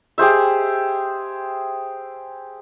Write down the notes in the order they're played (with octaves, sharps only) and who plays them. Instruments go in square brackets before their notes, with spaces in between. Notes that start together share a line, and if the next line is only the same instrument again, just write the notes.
[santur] G4 G#4 C5 E5